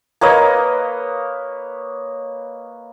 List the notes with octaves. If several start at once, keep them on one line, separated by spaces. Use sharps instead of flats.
A#3 B4 C#5 D#5